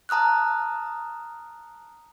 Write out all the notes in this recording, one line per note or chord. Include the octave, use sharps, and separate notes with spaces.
A5 A#5 D#6 F6 F#6